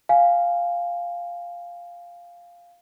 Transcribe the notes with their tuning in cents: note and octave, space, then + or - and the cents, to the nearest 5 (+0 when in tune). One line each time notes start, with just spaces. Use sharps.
F5 +0 G#5 +0